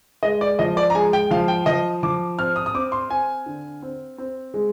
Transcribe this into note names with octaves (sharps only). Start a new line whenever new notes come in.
G#3 D#5
D5
F3 D#5
D5
A#5
G#3 G#5
G5
F3 F5
G5
F3 D#5
F3 D6
C4 F6
D#6
D#6
C4 D6
C6
C4 G#5
D3
C4
C4
G#3